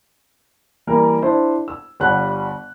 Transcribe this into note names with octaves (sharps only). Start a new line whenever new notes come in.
E3 G3 A#3 A#4
D4 E4 C5
E6
G1 G3 F#5 F#6